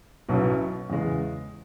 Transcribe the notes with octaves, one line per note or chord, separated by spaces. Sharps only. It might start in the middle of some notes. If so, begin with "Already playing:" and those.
B1 B2 F#3 C#4 E4
E2 C#3 G#3